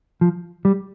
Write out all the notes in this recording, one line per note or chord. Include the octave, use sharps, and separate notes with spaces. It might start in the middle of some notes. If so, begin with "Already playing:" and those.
F3
G3